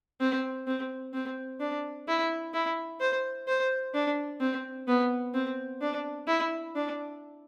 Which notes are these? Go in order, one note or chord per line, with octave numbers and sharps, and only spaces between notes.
C4
C4
C4
D4
E4
E4
C5
C5
D4
C4
B3
C4
D4
E4
D4